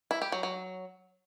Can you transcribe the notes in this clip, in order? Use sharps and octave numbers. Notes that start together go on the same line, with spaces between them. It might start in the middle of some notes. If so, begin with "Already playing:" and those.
E4
G4
F#3
F#3